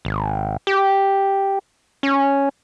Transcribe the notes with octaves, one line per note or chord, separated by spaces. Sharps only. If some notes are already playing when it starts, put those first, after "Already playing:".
G#1
G4
C#4